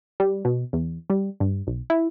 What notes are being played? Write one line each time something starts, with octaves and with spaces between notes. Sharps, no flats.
G3
B2
E2
G3
G2
B1
E4